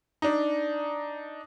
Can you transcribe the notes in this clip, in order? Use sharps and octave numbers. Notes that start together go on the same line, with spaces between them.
D4 D#4